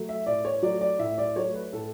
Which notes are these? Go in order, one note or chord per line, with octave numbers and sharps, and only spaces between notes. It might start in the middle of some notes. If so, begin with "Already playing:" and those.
Already playing: F#3 A3
E5
A2 D5
C#5
F#3 A3 D5
D5
A2 E5
D5
F#3 A3 C#5
B4
A2 A4